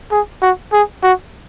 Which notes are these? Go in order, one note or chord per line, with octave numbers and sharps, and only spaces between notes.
G#4
F#4
G#4
F#4